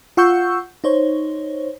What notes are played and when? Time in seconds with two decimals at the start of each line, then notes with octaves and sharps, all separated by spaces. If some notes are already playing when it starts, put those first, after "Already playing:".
0.17 F4 F#5 C#6 E6 G6
0.84 D#4 C5 C#5